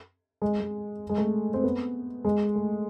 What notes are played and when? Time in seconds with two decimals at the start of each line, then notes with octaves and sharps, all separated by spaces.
0.42 G#3
0.60 G#3
1.09 G#3
1.18 A3
1.54 C4
1.64 B3
2.25 G#3
2.55 A3